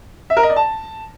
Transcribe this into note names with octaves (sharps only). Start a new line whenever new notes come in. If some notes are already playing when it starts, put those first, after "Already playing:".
E5
A#4
D#5
D5
A5